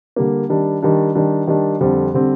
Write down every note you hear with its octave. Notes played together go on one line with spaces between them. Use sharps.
D3 G3 A#3
D#3 G3 D4
D#3 G3 D4
D#3 G3 D4
D#3 G3 D4
F2 D3 G3 C4
D3 G3 C4